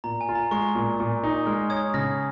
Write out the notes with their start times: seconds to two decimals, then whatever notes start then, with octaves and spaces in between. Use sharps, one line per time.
0.04 A#2 A#5
0.21 G#5
0.29 F4
0.35 A#5
0.51 G#3 C#6
0.75 A#2
1.00 A#2
1.23 D#4
1.47 G#3 F6
1.70 C#5 D#6 G#6
1.94 C#3 F6 A#6